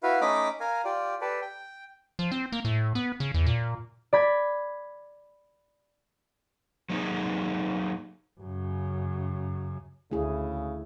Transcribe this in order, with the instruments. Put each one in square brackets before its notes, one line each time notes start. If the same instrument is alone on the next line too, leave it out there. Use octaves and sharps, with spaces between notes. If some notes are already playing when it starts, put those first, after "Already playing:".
[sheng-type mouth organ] E4 F#4 B4 F5
A3 C#4 D#4 D#5 B5 D6
A#4 F5 G#5
F4 G4 D5
G4 A4 B4 D5
G5
[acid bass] F3
C4
A#3
A2
B3
C#3
E2
A#2
[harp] D5 B5 G#6
[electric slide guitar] F#3 A#3 D#4 G#4
[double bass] F#2 C#3
[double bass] D2 [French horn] C#3 [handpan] A3 E4 G#4